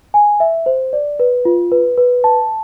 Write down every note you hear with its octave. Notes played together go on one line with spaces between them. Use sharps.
G#5
E5
C5
D5
B4
F4
B4
B4
A5